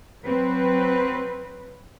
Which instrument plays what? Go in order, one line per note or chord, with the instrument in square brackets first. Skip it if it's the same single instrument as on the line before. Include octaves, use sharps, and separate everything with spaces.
[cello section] F#3 C4 B4